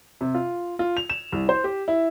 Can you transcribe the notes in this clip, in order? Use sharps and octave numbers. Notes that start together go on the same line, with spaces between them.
C3
F4
F4
F7
E7
C2
C5
G4
E4